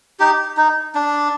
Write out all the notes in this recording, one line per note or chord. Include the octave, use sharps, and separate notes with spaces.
D#4 G4
D#4
D4